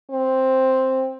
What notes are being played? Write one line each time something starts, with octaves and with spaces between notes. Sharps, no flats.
C4